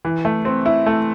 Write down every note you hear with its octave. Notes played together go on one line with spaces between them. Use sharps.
E3
A3
C4
E4
A3